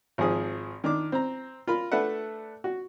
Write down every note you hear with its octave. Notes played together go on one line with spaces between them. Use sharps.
G#1 F3 G#4 D#6
D#3 D4 D6
C4 A#5
F4 A#4 B5
A3 D4 A4 B4 E5 F#5
F#4